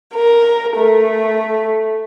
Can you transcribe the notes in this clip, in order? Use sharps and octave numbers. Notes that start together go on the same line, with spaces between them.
A#4
A3